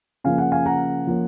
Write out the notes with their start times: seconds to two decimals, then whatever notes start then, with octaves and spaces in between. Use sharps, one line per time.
0.24 C#3 F3 A#3 F5 G#5
0.38 F#5
0.52 F5 G#5
0.66 F#5 A#5
1.07 F3 A#3 C#4